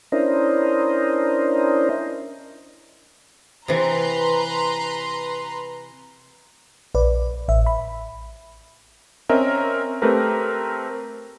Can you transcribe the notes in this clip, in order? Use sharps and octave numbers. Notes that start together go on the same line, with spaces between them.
C#4 D4 E4 A#4 C5 D#5
C3 E3 B4 A#5 C6
A#1 B4 D5
A1 E5
B5
C4 C#4 A#4 D#5 E5
A3 C4 G4 A#4 B4